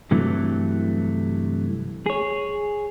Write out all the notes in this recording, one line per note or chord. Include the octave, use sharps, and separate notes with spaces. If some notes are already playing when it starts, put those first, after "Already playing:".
G2 C3 E3 F#3 A3
G#4 C#5